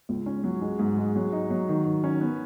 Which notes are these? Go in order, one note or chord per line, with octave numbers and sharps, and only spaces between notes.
C#2
C#4
F#3
G#3
G#2
G#3
F#3
D#4
F#3
D#3
D#3
C#4
B3